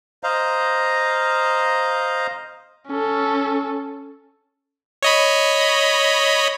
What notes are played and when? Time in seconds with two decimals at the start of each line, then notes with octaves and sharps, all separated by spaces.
0.24 C5 D#5 F5 A#5
2.88 C#4 A4
5.02 C#5 D#5 B5